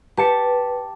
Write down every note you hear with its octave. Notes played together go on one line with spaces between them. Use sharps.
G4 B4 A5 C#7